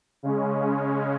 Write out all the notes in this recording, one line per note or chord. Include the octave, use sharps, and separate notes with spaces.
C#3 G#3 C#4